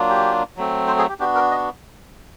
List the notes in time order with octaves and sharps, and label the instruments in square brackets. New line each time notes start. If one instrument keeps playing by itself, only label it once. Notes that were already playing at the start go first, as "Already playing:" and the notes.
Already playing: [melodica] F#3 A#3 D4 F4
G4
F#3 A3 C4
C5
G#4
G4
B3 D4 F#4 G4
A#4
D#5